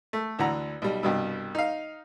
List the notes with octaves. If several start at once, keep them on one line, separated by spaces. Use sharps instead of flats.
A3
D2 E3 D4 F#5 A#5
B1 G3
C2 G2 B2
D#4 F5